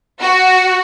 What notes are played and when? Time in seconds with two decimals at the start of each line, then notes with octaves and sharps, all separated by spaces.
0.21 F#4